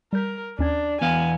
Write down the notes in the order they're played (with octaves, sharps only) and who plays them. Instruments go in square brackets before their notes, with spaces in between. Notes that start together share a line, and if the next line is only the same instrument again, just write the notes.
[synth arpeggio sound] G3 G6 B6 [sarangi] A#4
[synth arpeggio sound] D#2 C#4 G#6 [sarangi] D4
[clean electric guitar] E2 B3 F5 [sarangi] G#5